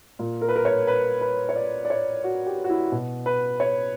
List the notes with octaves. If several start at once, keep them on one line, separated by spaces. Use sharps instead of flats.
A#2
A#4
B4
A#4
C#5
B4
B4
C#5
D5
D5
C#5
F#4
G4
F#4
E4
B2
B4
C#5